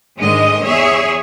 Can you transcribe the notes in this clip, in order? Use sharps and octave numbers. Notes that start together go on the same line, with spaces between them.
G#2 D3 D#3 G#3 D#5
E2 G#4 C#5 E5